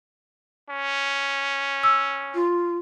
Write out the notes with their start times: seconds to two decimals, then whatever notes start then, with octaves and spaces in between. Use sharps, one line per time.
0.70 C#4
1.83 E6
2.35 F4